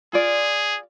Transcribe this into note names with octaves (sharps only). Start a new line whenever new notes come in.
F4 G#4 D5